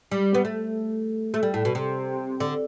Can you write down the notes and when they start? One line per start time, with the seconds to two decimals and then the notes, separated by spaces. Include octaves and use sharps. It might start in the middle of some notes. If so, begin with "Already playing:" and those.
0.11 G3
0.34 B3
0.45 A3
1.34 A3
1.43 G3
1.54 A2
1.65 B2
1.75 C3
2.40 D3